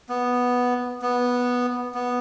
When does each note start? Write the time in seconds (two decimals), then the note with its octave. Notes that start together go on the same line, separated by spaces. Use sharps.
0.09 B3
1.02 B3
1.95 B3